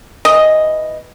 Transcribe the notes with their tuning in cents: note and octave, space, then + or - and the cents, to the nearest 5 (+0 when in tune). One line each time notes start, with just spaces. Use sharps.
E3 -10 D#5 +0